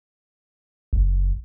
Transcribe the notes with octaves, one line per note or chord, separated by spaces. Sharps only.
F#1